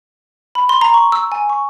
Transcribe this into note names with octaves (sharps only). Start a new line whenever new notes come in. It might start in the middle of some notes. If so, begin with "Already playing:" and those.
B5
C6
A#5
C#6
E6
G#5
C#6